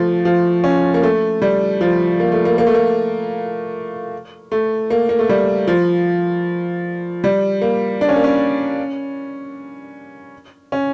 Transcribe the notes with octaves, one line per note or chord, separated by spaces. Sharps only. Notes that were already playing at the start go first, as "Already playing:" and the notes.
Already playing: F3 A3
F3
C#4
A#3
A3
G3
F3
A#3
A3
A#3
A#3
A3
A#3
A3
A#3
A#3
A3
G3
F3
G3
A#3
D4
C#4
A#3
C#4
C#4